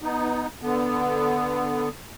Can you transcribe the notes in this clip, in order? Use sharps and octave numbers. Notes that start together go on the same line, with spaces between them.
B3 D#4
D3 B3